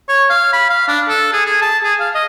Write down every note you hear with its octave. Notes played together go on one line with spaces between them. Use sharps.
C#5
F5
B5
F5
D4
A4
G#4
G#4
A5
G#4
F5
D#5